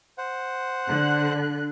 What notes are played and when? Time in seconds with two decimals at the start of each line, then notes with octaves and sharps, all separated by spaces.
0.18 C5 F#5
0.86 D3 F#6